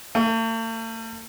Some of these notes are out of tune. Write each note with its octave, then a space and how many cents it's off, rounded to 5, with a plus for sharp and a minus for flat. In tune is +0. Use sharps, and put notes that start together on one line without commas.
A3 +45